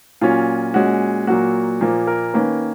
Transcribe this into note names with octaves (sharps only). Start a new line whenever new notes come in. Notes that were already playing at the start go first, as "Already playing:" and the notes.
A#2 F#3 C#4 F4
A#2 G#3 C#4 F#4
A#2 F#3 A#3 F#4
A#2 F3 A#3
A#4
D#3 A#3 C#4 B4